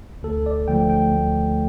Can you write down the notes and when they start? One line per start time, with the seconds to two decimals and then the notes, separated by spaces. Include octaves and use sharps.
0.23 D2 A4
0.46 D5
0.68 D3 F3 A3 G5
0.90 G5
1.12 D2